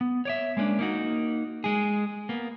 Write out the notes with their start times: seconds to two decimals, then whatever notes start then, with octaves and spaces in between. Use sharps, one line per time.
0.01 B3
0.25 C#5 D5 E5
0.57 G#3 A#3 C#4 D4
0.79 A#3 D#4 F#4
1.64 G#3 G#4
2.29 A#3 B3